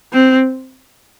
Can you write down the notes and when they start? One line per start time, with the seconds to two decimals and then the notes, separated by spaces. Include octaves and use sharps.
0.13 C4